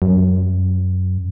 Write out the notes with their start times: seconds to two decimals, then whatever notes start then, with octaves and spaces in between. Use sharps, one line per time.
0.02 F#2